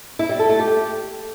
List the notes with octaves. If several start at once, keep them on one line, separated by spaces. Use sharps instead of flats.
E4
G3
A4
A3
G4